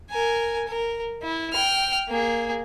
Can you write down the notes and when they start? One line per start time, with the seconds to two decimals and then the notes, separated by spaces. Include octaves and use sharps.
0.11 A#4 G#5
0.68 A#4
1.23 E4
1.53 G5 F6
2.08 A#3 G#4